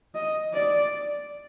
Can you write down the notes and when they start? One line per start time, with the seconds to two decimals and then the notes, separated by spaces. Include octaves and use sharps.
0.14 D#5
0.53 D5